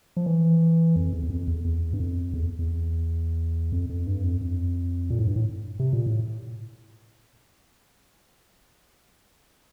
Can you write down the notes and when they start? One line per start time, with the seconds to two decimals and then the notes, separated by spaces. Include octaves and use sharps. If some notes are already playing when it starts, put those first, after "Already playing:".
0.17 F3
0.26 E3
0.96 F2
1.13 E2
1.23 E2
1.30 F2
1.48 E2
1.65 E2
1.93 G2
2.00 F2
2.34 E2
2.59 E2
3.72 F2
3.89 F2
4.07 G2
4.24 F2
4.41 F2
5.10 A#2
5.19 A2
5.27 G2
5.36 A2
5.79 C3
5.93 A#2
6.06 A2